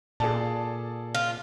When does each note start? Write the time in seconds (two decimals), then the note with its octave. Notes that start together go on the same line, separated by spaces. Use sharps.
0.20 A#2 G#4 A4 D5 A5
1.15 F4